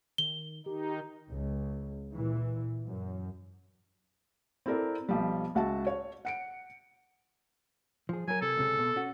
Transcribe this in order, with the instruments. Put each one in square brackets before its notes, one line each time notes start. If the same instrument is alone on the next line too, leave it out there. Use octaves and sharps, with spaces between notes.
[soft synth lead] D#3 [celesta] G7
[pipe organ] D#3 D#4 [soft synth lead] G4
[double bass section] C#2
A#2 E3
F#2
[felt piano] C4 E4 A4 A#4 D5
B1 F3 G3
C#2 F#4 E5 A5
C#5
F#5 C#7 D7
[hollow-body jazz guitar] F3 G#4
[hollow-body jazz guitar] F#3 A#4 [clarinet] G#5
[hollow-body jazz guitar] C3 [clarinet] A4
[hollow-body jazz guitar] C#2 C3 G#4
B2
C#4 F#4